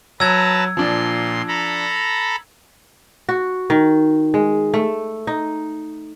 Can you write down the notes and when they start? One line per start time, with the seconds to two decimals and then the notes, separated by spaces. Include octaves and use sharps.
0.20 F#3 B4 A5 A#5 E6 G#6
0.77 A#2 F3 D4 C6
1.48 A4 A#5 B5
3.29 F#4
3.70 D#3
4.34 G#3
4.74 A3
5.27 D#4